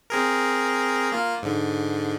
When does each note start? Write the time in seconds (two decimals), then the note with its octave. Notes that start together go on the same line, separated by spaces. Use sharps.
0.10 C4 G#4 A#4
1.12 A#3 F4
1.42 G#2 D3